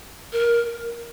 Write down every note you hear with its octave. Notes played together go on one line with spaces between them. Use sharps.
A#4